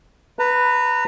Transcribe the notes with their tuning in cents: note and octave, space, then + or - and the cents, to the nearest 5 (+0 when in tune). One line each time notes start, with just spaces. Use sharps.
B4 +0 A#5 -30